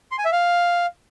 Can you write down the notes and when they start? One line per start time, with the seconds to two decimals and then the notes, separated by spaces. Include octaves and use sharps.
0.11 C6
0.18 G#5
0.25 E5
0.32 F5